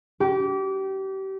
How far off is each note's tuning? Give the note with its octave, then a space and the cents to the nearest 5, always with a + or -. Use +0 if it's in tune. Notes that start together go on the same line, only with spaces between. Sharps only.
G4 -30